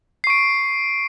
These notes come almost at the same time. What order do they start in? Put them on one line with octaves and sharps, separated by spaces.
C7 C#6 D7